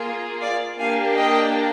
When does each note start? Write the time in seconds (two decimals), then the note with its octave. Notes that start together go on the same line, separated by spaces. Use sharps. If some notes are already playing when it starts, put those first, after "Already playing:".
Already playing: A#3 F4 G#4
0.42 D5 F5
0.79 A#3 D4 G4 F5 G#5
1.16 D#5 G5